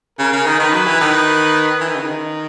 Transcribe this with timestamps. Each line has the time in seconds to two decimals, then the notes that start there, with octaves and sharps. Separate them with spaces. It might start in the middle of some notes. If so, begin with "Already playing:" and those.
0.19 C#3 A#4
0.33 C#3
0.46 D#3
0.60 D#3 B4
0.73 F#3
0.86 E3
1.01 D#3
1.81 E3
1.88 D#3
1.95 C#3
2.02 D#3